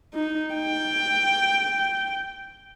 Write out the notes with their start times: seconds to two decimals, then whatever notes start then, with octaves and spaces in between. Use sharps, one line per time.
0.14 D#4
0.55 G5